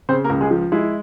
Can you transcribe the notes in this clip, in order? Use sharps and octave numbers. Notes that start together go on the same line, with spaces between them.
C#3 C4 C5
A#3 A#4
C#2
G#3 G#4
F3
G#3 E4